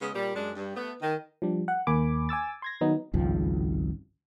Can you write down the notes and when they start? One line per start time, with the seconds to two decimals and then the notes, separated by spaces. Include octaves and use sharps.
0.01 C#3 G#3 B3 D#5
0.14 A#2 G3
0.35 F#2 G#3 D4
0.56 G2
0.76 A3 B3
1.02 D#3
1.42 F3 G3 D4
1.68 F#5
1.87 D#2 A#3 G#5 B5 D6
2.29 G#5 D6 E6 A6
2.62 C6 G#6 A#6
2.81 D#3 F#3 B3 D#4
3.14 G#1 C#2 G2 F3